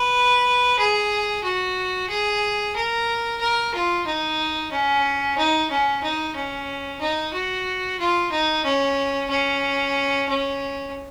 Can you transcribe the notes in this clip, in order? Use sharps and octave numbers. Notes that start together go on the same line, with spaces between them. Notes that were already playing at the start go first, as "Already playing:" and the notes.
Already playing: B4
G#4
F#4
G#4
A#4
A#4
F4
D#4
C#4
D#4
C#4
D#4
C#4
D#4
F#4
F4
D#4
C#4
C#4
C#4